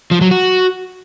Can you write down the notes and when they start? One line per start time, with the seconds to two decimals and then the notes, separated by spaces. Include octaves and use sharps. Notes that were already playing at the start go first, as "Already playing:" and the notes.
0.11 F3
0.21 F#3
0.31 F#4